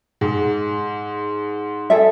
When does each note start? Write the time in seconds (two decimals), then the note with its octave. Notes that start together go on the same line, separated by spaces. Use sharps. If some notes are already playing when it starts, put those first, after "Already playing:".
0.21 G#2
1.90 G#4 A4 E5